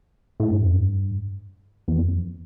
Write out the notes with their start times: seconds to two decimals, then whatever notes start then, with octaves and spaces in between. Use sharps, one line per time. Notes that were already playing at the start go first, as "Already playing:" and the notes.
0.40 A2
0.51 G2
0.61 F2
0.74 G2
1.88 E2
1.97 F2